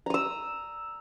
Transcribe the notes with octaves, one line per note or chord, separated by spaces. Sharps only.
A#5 D#6 E6